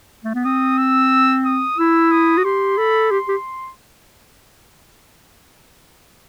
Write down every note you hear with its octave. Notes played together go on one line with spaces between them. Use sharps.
A3
B3
C4 D#6
E6
D#6
E4 E6
D#6
F#4
G4 C6
A4 B5
G4 C6
G4